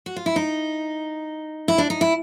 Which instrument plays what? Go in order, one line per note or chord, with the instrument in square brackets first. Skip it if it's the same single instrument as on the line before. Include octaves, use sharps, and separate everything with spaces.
[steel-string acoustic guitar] F#4
F4
E4
D#4
E4
D4
D#4
E4